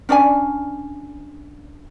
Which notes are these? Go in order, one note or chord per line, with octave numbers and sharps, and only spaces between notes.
C#4 D4 D5 G#5